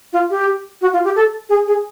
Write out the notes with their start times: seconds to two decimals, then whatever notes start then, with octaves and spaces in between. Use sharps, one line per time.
0.13 F4
0.30 G4
0.82 F#4
0.93 F4
1.04 G4
1.16 A4
1.49 G#4
1.67 G#4